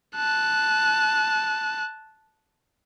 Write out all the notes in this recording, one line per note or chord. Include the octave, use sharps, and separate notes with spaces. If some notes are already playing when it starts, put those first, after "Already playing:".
A5 F#6